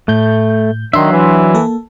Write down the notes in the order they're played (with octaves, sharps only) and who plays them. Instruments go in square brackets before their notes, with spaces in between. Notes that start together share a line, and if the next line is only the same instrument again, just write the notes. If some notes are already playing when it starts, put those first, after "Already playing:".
[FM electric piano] A2 G6 [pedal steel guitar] A3
[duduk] D#3 [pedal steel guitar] F#3 E5 [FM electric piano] D4 C6
[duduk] E3
[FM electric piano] A#3 A4